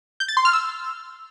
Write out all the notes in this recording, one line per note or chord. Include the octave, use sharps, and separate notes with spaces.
G6
A6
C6
F6
E6